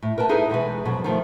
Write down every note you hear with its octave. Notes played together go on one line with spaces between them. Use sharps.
A2
A#4 B4 G5 A5
D#4 E4 G#4 A4 B4 E5
E2 B2 G#3 B4
F2 B2 F#3
D#3 F3 G#3 A3